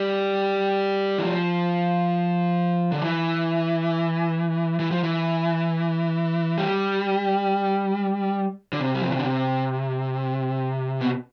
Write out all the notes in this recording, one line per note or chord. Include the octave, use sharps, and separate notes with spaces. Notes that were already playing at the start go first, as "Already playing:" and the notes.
Already playing: G3
E3
F3
D3
E3
E3
F3
E3
G3
D3
C3
G3
F3
E3
D3
C3
B2